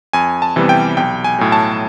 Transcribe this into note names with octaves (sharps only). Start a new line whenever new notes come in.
F2 G#5
A5
C3 E3 G3 B3
G5
B1 G5
G#5
A2 F#3
A5